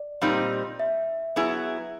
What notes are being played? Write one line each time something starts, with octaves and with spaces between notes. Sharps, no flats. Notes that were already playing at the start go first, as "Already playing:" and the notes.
Already playing: D5
A#2 G3 C4 D#4
E5
F#3 B3 E4 G#4